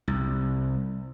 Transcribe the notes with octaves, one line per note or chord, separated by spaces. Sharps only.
C2